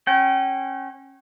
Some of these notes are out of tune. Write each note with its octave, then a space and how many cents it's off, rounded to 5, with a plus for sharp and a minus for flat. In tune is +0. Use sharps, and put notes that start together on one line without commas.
C#4 -25 G5 -35